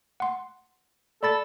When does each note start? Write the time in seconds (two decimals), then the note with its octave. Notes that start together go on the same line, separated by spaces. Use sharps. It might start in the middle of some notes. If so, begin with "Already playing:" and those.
0.20 F#5 C6
1.23 A4 D5 B5 A6